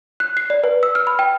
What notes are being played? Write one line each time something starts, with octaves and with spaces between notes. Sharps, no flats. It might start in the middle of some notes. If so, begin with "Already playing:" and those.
F#6
C7
D5
B4
E6
F6
B5
G5